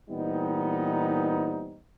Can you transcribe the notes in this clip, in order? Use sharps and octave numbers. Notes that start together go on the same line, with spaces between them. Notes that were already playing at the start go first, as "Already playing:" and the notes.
A#2 E3 G3 B3 C4 D#4